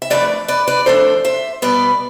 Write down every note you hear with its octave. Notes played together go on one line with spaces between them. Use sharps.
E5
F2 E3 A3 D4 B4 D5
B4 D5
B4 D5
F2 E3 A3 D4 A4 C5
C5 E5
B2 G3 B3 B4 D5